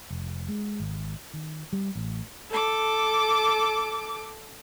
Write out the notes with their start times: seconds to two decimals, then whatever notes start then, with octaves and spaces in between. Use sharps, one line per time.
0.10 F1
0.49 G#3
0.80 G#1
1.34 D#3
1.73 G3
1.95 A1
2.51 A4 D6